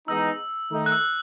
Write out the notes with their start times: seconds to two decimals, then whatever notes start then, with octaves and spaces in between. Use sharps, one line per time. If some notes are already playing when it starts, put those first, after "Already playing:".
0.08 E3 G#3 B3 D#4 E6
0.72 D#3 A3 D#4
0.86 F#6
0.92 E6